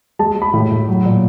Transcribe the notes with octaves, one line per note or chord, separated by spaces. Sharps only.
G#3 A5
G#3
B5
A2
A2
F#3
A#2